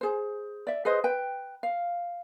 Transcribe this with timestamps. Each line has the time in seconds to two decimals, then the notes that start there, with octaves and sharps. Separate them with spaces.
0.01 G#4 C5
0.67 D5 E5
0.85 G#4 B4 C5 D#5
1.04 B4 G5
1.63 F5